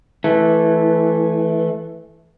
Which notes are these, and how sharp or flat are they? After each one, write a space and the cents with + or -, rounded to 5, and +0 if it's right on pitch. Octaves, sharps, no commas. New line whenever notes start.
E3 +0 A3 -15